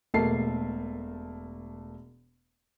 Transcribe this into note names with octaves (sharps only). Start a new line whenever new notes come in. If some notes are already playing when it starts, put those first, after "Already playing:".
E1 A3 A#3 A5 C7